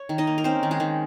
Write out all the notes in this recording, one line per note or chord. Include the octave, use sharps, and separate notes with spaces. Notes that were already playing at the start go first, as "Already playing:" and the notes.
Already playing: C#5
D#3
D#4 D#5
A#3
A#4
C4 C#4 C5
D#3
G#3 G#4
D#3